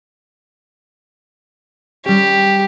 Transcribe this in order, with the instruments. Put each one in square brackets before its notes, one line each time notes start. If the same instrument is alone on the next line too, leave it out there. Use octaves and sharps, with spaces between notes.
[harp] G3 C#4 [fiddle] G4